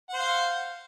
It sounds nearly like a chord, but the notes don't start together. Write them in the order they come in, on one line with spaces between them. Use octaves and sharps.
F#5 C5 F5